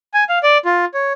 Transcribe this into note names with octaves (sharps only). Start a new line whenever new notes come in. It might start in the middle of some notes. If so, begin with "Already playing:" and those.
G#5
F5
D5
F4
C#5